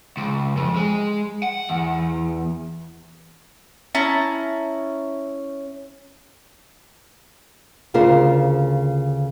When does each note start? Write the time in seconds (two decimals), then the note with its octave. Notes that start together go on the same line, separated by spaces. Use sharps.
0.17 C#2
0.57 F2
0.76 G#3
1.43 F#5
1.69 E2
3.95 C#4 E4 A5 A#5
7.94 D2 C#3 F4 A#4 C5